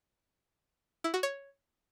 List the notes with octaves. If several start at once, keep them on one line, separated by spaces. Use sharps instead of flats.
E4
F#4
C#5